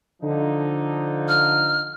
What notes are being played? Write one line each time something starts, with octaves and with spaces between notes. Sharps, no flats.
D3 F3 D#4
F6